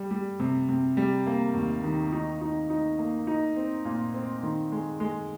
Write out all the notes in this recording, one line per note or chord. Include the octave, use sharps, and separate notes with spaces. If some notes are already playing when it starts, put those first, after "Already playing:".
Already playing: G3
G3
C3
C3
G3
A#3
D#2
D#3
D#4
D#4
D#4
A#3
D#4
C4
A#2
C4
D#3
G#3
G#3